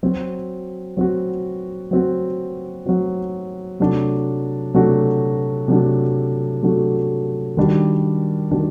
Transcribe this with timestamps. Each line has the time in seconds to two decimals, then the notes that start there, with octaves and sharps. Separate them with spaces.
0.03 F#3 C4 F#4
0.97 F#3 C4 F#4
1.91 F#3 C4 F#4
2.86 F#3 C4 F#4
3.80 C3 F#3 A3 D4 F#4
4.74 C3 F#3 A3 D4 F#4
5.68 C3 F#3 A3 D4 F#4
6.62 C3 F#3 A3 D4 F#4
7.57 D#3 G3 D4 F#4
8.51 D#3 G3 D4 F#4